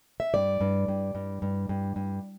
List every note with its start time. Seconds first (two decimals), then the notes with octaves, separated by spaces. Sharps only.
0.20 E5
0.34 G2 D5
0.61 G2
0.88 G2
1.15 G2
1.42 G2
1.69 G2
1.96 G2